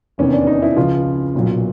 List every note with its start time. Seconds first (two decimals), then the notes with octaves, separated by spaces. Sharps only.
0.18 F1 E2 C3 D#3 C#4
0.33 D4
0.47 D#4
0.62 E4
0.76 C#2 C#3 F3 F4
1.35 B1 A#2 F#3